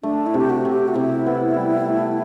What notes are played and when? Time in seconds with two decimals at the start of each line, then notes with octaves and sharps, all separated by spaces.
0.03 A3 D4
0.26 E4
0.34 C3 G4
0.50 F#4
0.65 C3
0.72 G4
0.88 F#4
0.95 C3 E4
1.26 B3
1.56 G3
1.87 A3